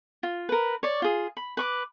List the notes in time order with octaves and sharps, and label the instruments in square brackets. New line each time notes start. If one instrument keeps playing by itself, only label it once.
[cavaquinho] F4
A#4 B4
C#5 D5
F4 G#4
B5
B4 C#6 D6